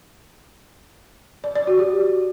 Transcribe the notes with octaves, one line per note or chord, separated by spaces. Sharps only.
D5
D5
F#4
G4